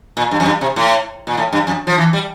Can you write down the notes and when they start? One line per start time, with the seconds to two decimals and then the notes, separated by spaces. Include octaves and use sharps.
0.17 A#2
0.31 G2
0.40 F2
0.46 G2
0.61 C3
0.76 A2
1.27 A#2
1.37 A2
1.52 G2
1.67 F2
1.87 F3
1.98 E3
2.13 G3